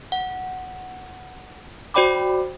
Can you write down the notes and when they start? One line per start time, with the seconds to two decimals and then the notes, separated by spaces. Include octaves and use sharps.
0.12 F#5
1.94 F#4 C5 D5 G5 B5 D6